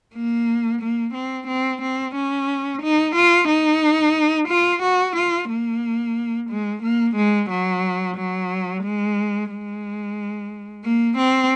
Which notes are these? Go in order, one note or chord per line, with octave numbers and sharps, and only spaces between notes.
A#3
A#3
C4
C4
C4
C#4
D#4
F4
D#4
F4
F#4
F4
A#3
G#3
A#3
G#3
F#3
F#3
G#3
G#3
A#3
C4